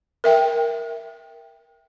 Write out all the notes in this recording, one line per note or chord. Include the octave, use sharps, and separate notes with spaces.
A#4 E5 G5